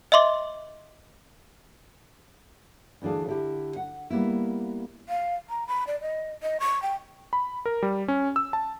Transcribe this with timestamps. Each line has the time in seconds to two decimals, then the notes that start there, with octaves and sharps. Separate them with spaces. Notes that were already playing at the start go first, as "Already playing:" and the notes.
0.12 D#5 E5 C6 D6
3.02 D2 E3 D4 G#4 F5
3.27 D3 E4 G4
3.76 F#5
4.10 G3 A#3 B3 E4
5.09 F5
5.50 A#5
5.67 B5
5.87 D5
6.01 D#5
6.43 D#5
6.60 C#6
6.82 G5
7.33 B5
7.66 A#4
7.82 G3
8.08 C#4
8.36 E6
8.53 A5